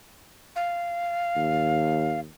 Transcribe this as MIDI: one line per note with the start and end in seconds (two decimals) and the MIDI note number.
0.56 2.20 77
1.36 2.30 39